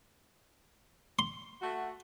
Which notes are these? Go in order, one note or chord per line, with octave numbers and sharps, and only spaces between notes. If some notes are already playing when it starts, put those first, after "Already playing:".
C6
A3 F#4